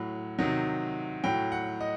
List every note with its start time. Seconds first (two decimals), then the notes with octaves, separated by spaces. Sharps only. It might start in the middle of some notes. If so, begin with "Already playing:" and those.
Already playing: A2 F#3
0.39 C3 D#3 F#3
1.24 A2 F#3 G5
1.52 F#5
1.80 D#5